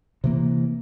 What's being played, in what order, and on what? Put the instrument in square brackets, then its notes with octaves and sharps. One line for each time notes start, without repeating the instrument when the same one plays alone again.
[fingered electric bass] C3 E3 A#3